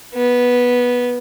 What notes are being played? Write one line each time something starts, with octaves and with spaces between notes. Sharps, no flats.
B3